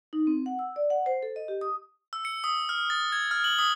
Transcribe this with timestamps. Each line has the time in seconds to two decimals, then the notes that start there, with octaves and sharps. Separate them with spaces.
0.13 D#4
0.27 C4
0.46 F#5
0.59 E6
0.76 D5
0.90 F#5
1.06 C5
1.23 A4
1.36 D#5
1.48 G4
1.61 D#6
2.13 E6
2.25 C#7
2.44 D#6
2.69 F6
2.90 A6
3.12 G#6
3.31 F6
3.44 F#7
3.59 D#6